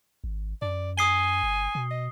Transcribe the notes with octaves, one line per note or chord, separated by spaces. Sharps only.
G#1
F#2 D5
G#5 D#6 C7 G7
G1
B2
D#5